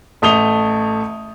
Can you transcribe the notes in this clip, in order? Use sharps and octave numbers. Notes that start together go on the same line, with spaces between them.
A1 A3 D#6 F7 G7